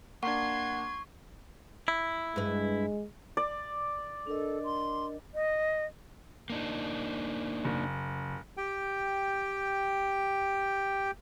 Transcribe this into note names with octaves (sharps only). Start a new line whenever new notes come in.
A#3 D4 F#5 C6 C#6 G#6
E4
G2 G#3 B4
D5
D4 A4 A#4 D#5
C6
D#5
A#3 D4 D#4
F#1
G4 G5